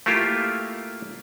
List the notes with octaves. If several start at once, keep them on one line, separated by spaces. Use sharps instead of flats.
A3 A#3 E4 F4 G4